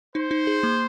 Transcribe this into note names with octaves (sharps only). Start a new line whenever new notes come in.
D#4 C5
D#4
G#4
A#3